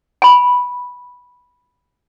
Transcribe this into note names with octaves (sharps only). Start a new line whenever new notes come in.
G#5 B5